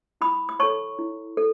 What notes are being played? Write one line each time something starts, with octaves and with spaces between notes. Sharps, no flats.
E4 B5 D#6
D#6
A4 C#5 A5 C#6
E4
A4